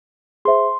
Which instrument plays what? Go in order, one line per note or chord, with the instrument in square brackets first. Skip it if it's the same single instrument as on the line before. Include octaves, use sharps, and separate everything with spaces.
[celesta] G#4 C5 E5 [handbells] C6